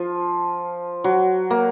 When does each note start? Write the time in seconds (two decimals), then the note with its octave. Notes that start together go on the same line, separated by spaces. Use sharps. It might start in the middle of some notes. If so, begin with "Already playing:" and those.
Already playing: F3
1.04 F#3
1.50 A#3